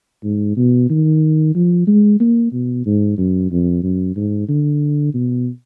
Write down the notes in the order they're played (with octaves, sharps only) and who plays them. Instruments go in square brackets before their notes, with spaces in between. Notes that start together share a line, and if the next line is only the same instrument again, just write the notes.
[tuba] G#2
B2
D#3
F3
G#3
A#3
B2
G#2
F#2
F2
F#2
G#2
D3
B2